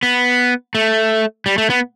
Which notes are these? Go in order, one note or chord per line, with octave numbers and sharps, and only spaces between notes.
B3
A3
G3
A3
B3